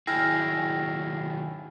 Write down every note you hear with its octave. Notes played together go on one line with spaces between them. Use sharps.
D#3 F#3 E4 G#4 G5 E6 F6 A#6